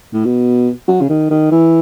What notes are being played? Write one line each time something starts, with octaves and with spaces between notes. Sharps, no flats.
A2
B2
F#3
C#3
D#3
D#3
E3